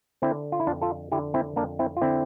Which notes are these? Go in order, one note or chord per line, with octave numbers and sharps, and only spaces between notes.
D3 C4 E4
F4
E4
F2 D4 F4
F4 A4
D3 E4 G4
C4 E4
F2 A#3 D4
C4 E4
F4
D3 C4 E4